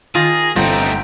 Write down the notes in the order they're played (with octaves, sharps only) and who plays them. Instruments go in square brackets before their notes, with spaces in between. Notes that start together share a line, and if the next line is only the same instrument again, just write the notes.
[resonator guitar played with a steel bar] D#3 F4 [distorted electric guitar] G#4 [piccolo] A#6
[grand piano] G1 [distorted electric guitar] A3 D#4 [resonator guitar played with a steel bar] C4 [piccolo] G5